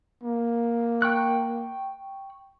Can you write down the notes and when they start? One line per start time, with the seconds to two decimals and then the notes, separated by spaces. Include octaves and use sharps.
0.24 A#3
1.02 G5 C#6 F#6